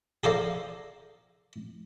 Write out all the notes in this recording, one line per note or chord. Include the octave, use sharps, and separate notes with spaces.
G#4 A4 C5 D5 F5 A#5